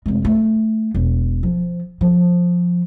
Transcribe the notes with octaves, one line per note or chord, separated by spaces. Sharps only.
F1 G#3
A3
E1
F3
F3